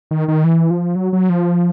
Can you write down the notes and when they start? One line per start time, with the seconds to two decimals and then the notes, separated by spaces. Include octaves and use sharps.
0.11 D#3
0.28 D#3
0.44 E3
0.71 F3
0.95 F#3
1.13 F#3
1.30 F3